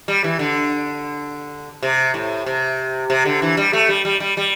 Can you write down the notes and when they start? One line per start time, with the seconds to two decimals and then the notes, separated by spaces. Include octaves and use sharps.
0.08 G3
0.24 E3
0.39 D3
1.83 C3
2.14 A2
2.46 C3
3.10 C3
3.25 D3
3.42 E3
3.57 G3
3.73 A3
3.89 G3
4.05 G3
4.20 G3
4.37 G3